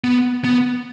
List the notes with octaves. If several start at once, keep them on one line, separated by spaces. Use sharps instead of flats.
B3
B3